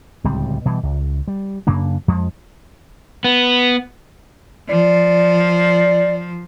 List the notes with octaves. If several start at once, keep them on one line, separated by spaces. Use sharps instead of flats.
D1 C#2 G3 C4
B2 E3 G3
C#2
G3
F#2 C#3 A#3 D4
F2 F3 G#3
B3
F3 D5